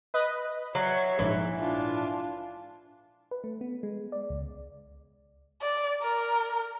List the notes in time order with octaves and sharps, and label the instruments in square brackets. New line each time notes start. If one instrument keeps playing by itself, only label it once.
[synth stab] B4 D#5
[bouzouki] F#3 [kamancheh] C#5 E5 [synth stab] C7
[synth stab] A#1 G#2 [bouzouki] E3
[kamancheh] D4 F4
[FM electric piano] B4
A3
B3
G#3
D5
C#2
[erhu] D5
A#4